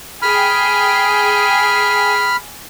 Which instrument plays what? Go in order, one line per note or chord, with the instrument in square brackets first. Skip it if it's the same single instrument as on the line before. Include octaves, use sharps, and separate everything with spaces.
[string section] G#4 G5 [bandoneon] B5 F6